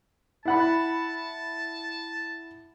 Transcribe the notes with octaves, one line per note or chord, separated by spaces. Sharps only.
E4 F#5 A5 B5